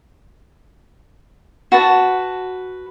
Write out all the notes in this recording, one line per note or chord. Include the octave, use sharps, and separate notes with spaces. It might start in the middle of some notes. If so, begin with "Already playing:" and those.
F#4 B4 A5